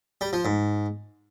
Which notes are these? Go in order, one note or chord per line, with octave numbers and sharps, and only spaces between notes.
G3
F3
G#2